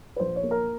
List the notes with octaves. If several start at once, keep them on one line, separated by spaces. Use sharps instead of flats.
B4
A#1 C5
C#5
A#3
A#4